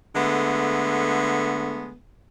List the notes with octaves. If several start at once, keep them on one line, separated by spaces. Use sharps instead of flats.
D3 G#3 A3 B3